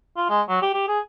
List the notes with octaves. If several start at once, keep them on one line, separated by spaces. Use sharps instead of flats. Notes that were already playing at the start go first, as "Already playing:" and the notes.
F4
G#3
F#3
G4
G4
G#4